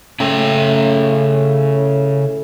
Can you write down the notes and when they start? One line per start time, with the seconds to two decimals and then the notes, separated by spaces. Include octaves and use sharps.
0.20 A2 C#3 C#4 G5